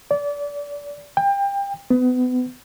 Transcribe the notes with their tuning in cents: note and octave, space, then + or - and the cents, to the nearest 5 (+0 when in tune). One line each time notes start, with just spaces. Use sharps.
D5 -25
G5 +25
B3 +30